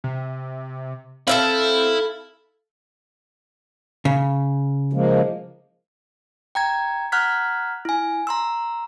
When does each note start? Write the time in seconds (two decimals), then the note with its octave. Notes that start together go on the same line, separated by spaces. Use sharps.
0.04 C3
1.28 C4 E4 A4 E5 F5
4.05 C#3
4.93 F3 G#3 A#3
6.55 G5 A#5 G#6
7.12 F#5 A#5 F6 F#6 G#6 B6
7.85 E4 G#5
8.27 A#5 C6 E6